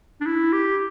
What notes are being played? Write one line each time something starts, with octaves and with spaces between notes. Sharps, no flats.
D4
E4
G4